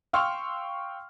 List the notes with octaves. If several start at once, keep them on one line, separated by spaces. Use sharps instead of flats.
F5 G5 C6 C#6 E6 F6